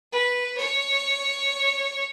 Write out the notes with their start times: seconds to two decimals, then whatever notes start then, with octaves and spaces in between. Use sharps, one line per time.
0.12 B4
0.58 C#5